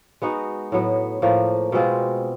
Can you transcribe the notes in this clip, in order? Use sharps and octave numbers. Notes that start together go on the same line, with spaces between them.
G#3 B3 D#4 F#4
A2 F#3 B3
A2 F3 A#3
B2 G#3 C4 F4